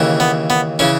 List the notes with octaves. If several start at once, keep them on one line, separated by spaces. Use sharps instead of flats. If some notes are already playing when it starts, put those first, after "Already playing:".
Already playing: D#2 C#3 E3
B3
B3
C#3 E3 C#4